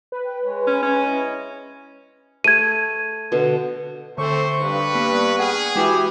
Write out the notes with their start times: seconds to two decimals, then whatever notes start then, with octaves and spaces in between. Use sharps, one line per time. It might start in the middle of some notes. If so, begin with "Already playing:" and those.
0.12 B4
0.25 G5
0.44 G#3 C#5
0.67 C#4
0.82 C#4
1.05 E4 D#5
2.44 A3 G#6 D#7
3.32 B2 D3
4.18 D3 A3 C4 A4 C5 C#6
4.60 G2 B4
4.95 A#3 B3
5.39 G#4 F#5 G5 F6
5.76 E3 G#3 E4 F#4 G4